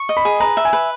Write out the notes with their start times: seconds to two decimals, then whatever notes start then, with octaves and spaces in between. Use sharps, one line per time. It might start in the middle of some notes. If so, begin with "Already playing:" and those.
Already playing: C#6
0.09 D#5
0.17 B5
0.25 G#4
0.40 B4 A#5
0.57 E5
0.65 G#5
0.73 B4